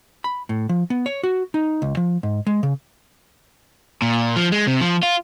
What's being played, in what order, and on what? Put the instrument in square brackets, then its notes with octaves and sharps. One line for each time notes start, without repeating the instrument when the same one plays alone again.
[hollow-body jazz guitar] B5
A2
F3
B3
C#5
F#4
D#4
C#2
F3
G#2
G#3
C#3
[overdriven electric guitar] A#2
F3
G#3
C3
F3
F4